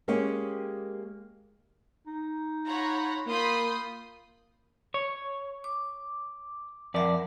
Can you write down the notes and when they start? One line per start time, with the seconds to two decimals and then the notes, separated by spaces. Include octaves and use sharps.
0.08 G#3 A#3 C#4 G4 G#4
2.07 D#4
2.66 F4 C#5 F#5 A#5 B5
3.27 A#3 F4 B5 C6 D#6 G6
4.94 C#5
5.64 D6
6.94 F2 A#4 D5 E5 F#5